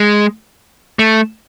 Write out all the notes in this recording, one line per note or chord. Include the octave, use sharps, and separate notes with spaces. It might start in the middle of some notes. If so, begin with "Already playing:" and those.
Already playing: G#3
A3